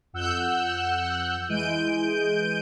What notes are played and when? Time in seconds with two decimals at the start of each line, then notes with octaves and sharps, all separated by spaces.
0.13 F2 F#5 E6 F#6 G6
1.49 E3 G#3 G6 D7 D#7